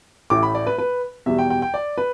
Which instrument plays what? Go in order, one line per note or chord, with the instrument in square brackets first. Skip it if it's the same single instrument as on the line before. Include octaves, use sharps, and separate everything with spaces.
[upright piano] A1 A2 A3 E4 [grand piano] D6
[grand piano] B5
D5
B4
B4
[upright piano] E2 B2 G3 [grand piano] E5
[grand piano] G5
G5
G5
D5
B4